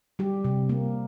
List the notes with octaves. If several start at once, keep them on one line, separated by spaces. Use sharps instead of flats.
G3 G4
C3
A#3